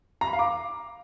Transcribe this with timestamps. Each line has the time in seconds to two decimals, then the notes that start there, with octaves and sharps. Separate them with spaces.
0.21 A#5
0.27 B5
0.33 F5
0.39 D6